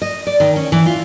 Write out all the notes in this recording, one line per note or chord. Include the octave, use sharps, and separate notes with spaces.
D#5
D5
D#3
C#4
E3
F4